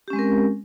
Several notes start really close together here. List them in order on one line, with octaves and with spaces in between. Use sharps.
G4 C#4 G#3 C4 A#4